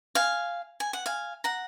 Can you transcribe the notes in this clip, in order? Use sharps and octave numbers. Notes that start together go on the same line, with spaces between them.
F5 G#5
G#5
F#5
F5 G#5
F#5 A#5